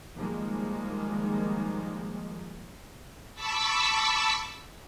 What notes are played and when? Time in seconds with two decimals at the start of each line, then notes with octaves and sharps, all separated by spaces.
0.16 D#3 F3 G3 G#3 A#3
3.35 A5 B5 C#6 D6 E6 B6